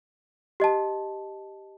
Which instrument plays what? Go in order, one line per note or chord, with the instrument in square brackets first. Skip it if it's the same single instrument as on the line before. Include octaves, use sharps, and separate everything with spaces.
[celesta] G4 D#5 A5